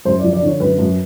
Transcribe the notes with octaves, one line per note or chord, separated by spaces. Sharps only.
F#2 C5
F3 D5
D5
D3 C#5
F#2 B4
F#2